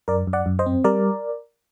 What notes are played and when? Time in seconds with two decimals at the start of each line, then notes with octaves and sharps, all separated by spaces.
0.08 F#2 A#4 D5
0.27 F#2
0.33 D5 F#5
0.46 F#2
0.59 C5 D#5
0.66 C4
0.84 G3 A#4 D5